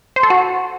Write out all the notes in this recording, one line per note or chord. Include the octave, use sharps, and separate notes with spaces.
C5
A4
F#4